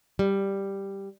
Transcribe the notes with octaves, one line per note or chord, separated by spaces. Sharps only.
G3